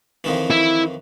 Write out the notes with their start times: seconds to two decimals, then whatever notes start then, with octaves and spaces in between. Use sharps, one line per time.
0.24 F2 D#3 E3
0.50 E4